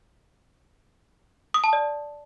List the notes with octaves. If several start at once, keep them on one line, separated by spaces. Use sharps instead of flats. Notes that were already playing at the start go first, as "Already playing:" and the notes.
D#6
A5
D5